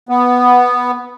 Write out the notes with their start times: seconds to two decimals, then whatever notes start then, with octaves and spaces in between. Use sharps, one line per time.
0.09 B3